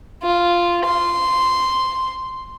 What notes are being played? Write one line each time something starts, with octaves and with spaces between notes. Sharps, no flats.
F4
C6